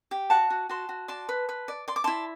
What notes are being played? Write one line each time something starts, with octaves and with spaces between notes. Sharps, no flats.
G4
F#4 F#5 A5
F#4
F#4 A5 C6
F#4
D5 A5 C6
B4
B4
D5
D5 C6
D6
E4 A5 C6